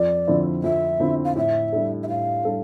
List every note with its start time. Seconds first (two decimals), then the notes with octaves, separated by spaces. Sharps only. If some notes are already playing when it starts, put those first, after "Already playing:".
Already playing: F2 D5
0.27 D3 F3 C4 E4
0.64 F2 E5
1.00 D3 F3 C4 E4
1.25 F5
1.36 A2 E5
1.73 G3 D4 A4
2.03 E5
2.08 A2 F5
2.44 G3 D4 A4